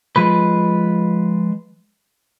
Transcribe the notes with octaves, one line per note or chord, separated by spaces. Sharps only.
F3 G#3 B4